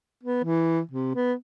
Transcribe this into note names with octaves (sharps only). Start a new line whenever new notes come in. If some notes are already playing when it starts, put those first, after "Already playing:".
B3
E3
C3
B3